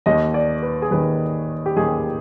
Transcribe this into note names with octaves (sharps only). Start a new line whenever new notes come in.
D#2 D#3 D#5
D5
B4
G#4
D#2 D#3 B4
G4
D#2 D#3 G#4